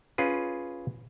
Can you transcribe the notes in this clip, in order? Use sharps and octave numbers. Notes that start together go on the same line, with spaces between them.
C#4 F4 G#4 B4